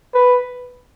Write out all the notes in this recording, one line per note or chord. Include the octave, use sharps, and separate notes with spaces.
B4